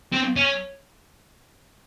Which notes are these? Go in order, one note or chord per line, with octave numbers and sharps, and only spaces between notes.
C4
C#4